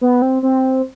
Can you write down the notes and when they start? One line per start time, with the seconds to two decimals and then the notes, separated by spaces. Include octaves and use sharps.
0.01 B3
0.22 C4
0.43 C4